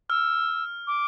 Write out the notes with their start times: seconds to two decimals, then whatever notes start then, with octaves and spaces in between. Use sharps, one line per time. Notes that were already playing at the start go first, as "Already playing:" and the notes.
0.10 E6 F6
0.87 D6